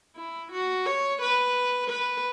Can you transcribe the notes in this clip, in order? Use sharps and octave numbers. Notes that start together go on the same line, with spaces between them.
E4
F#4
C#5
B4
B4